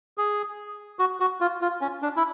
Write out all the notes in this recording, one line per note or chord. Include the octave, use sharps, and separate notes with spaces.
G#4
F#4
F#4
F4
F4
C#4
D4
E4